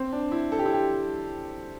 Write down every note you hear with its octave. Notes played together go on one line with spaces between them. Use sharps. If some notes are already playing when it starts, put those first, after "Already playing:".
Already playing: C4
D4
E4
A4
G4
E4
G4